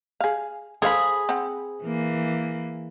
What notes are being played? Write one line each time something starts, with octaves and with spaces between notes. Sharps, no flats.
G#4 F5
G#4 A4 C5 F5 B5
C4 F#5
E3 A#3